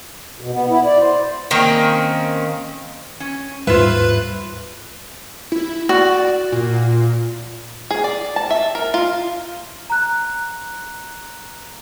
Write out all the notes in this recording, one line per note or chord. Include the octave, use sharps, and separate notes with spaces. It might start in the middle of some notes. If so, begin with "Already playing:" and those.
B2
B3
E4
D5
C5
D#3 A#3 C4 C#4
C#4
D#2 G#2 G3 F4 B4 C5 E5
E4
F#4 D5
A#2
G#4
D5
A5
E5
A#4
F4
A#5 F#6